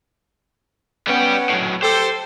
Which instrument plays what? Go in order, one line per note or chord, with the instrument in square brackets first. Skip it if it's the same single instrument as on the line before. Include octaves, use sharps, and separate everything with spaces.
[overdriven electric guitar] G3 G5 [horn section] B3 C#4
[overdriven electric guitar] A2 F#3
[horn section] G4 A4 [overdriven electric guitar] C5